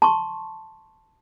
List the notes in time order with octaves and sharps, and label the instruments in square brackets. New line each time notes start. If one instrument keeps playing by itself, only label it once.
[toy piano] A5 C6 C#6